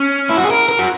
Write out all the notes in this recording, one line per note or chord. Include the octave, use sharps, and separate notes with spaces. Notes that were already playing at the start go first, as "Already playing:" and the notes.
Already playing: C#4
E4
F#4
G#4
A#4
A#4
F#4